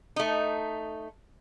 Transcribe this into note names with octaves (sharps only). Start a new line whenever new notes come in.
A3 D#4